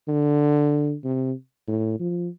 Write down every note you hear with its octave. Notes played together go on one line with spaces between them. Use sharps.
D3
C3
A2
F3